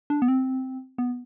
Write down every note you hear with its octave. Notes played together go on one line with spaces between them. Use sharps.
D4
B3
C4
B3